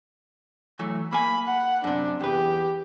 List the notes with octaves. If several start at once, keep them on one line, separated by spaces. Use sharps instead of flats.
E3 F#3 A3
A#3 G#5 B5
F#5
F#2 C3 D4
E2 G4 B4